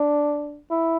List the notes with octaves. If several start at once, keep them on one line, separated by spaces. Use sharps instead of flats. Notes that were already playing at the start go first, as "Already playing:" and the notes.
Already playing: D4
E4